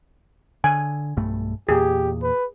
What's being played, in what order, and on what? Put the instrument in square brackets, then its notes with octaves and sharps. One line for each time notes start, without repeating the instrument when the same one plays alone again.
[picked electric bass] D3 [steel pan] G#5
[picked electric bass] B1 G2 A3
[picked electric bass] E2 A#2 [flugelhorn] G4 [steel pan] G#4
[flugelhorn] B4